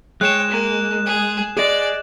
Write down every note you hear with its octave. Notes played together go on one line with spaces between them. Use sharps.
G#3 C#5 G5 F#6 E7
A#3
G#4
G#4 D5 D#5